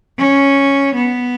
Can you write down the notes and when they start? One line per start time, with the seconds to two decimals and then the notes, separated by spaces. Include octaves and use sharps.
0.19 C#4
0.95 B3